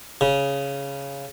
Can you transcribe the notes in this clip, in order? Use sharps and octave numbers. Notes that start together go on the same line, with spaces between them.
C#3